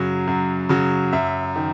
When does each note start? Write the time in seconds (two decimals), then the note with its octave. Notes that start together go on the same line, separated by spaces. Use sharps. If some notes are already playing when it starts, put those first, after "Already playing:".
Already playing: F#2 C#3 F#3
0.27 F#2
0.69 C#3 F#3
1.13 F#2 E5
1.56 D#3